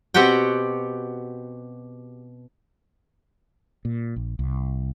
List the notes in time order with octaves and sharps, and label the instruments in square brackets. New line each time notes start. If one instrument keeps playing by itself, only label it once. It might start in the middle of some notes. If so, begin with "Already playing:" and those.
[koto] B2 C4 F#4 G4 F#5 G5
[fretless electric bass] A#2
A#1
C2